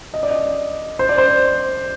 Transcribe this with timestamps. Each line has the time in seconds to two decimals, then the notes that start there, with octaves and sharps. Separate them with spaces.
0.14 D#5
0.23 D5
0.31 D#5
0.99 C5
1.09 D5
1.18 C5